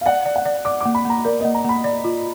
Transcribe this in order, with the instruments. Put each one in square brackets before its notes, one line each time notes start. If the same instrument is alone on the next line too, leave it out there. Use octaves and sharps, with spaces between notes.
[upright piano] F5
[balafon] D5 [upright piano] F#5
[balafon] D5
[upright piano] F#5
[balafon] D5
[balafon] D5 [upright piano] D6
[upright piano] D6
[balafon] A#3
[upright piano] B5
[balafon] A#3 [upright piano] A#5
[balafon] A#4 [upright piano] D5
[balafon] A#3 [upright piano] D#5
[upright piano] A#5
[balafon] A#3 [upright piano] B5
[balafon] D5
F4